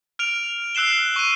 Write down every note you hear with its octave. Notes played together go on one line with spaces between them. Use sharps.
F6 D7 F7
E6 F#6 C7 E7 G7
C#6 D#7